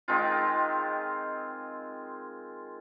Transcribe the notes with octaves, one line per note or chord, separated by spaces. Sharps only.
D#3 G#3 C4 F4